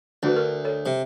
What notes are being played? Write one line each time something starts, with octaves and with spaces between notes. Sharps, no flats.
D2 D4 F#4 B4
A#4
A4 C#5
C3